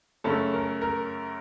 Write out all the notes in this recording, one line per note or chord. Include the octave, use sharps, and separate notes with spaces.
F#2 C#3 A3 C#4 A4
A#4
A#4